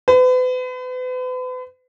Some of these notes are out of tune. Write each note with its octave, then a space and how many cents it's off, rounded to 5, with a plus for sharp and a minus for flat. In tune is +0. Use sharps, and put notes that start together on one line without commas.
B4 +40